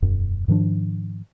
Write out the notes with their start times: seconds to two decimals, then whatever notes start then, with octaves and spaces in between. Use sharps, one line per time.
0.02 E1 F#2
0.48 G#2 D#3 F3 D4